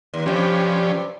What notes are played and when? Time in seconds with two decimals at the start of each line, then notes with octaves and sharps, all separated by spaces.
0.14 D#2
0.26 G2 C3 F3 C#4 G4